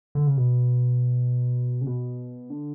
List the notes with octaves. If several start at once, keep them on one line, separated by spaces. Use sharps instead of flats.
D3
C#3
B2
C#3
B2
D3